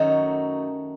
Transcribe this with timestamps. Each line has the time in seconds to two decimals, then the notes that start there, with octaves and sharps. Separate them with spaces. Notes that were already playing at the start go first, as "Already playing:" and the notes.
Already playing: F#2 D#3 A3 D#4 F#4